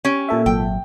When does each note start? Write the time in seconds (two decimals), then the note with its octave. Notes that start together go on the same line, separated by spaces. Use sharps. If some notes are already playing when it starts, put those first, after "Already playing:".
0.05 C#4 G4
0.28 A#2 A4 E5
0.46 G#1 F#3 G5